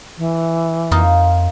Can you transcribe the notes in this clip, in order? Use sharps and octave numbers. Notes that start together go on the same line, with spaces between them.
E3
F2 A#3 D#4 F4